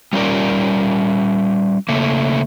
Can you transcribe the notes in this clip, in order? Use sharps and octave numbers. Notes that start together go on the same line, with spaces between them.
G3 C#4 F4 A#4 D5
C#3 A3 A#3